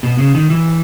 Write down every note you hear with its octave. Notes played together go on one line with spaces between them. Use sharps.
B2
C#3
D#3
E3